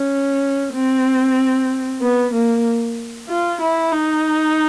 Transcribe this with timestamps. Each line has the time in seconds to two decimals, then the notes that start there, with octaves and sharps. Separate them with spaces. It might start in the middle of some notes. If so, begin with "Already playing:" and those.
Already playing: C#4
0.74 C4
2.01 B3
2.33 A#3
3.29 F4
3.61 E4
3.92 D#4